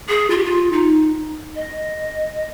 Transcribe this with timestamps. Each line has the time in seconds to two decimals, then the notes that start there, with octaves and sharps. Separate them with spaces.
0.09 G#4
0.30 F4
0.37 G4
0.44 F4
0.72 D#4
1.56 D#5